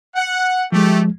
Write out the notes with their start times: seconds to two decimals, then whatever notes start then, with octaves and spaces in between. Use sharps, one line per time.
0.16 F#5
0.72 F3 G#3 A3 G4